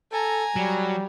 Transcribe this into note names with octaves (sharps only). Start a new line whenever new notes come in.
A4 G#5 A#5
F#3 G3